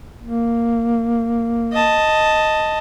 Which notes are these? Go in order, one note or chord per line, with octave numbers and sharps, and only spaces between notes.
A#3
D#5 A5